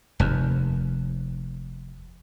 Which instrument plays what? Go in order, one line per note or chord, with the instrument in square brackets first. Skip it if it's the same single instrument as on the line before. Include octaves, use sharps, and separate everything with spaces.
[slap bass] F1 D#2